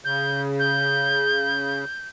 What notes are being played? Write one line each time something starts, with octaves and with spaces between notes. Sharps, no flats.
C#3 G6
G6